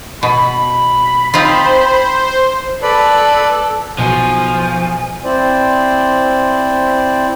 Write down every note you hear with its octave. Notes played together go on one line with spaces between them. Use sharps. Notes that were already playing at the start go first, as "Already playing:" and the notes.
B2 B5
C4 D#4 F4 C5
A4 B4 D5 B5
B1 F3 F#4 G#5
C4 E4 C5 D5